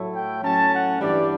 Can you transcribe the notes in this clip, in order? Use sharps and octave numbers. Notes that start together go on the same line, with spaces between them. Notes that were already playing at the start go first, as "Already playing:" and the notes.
Already playing: A2 F#3 A3 E4
G5
A2 F#3 C#4 A5
F#5
G2 E3 G3 D4 D5